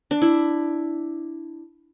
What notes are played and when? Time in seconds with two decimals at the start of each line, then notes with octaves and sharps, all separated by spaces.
0.11 D4
0.22 E4